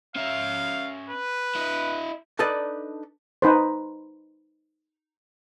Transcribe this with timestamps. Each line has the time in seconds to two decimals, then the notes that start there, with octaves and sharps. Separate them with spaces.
0.16 C#4 E5 F5
1.09 B4
1.55 E4 D#5
2.39 D4 D#4 A4 B4 D5 D#5
3.42 D#4 B4 C5